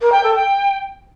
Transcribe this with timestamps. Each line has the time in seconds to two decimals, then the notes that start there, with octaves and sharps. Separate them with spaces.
0.01 A#4
0.12 G5
0.23 A4
0.35 G5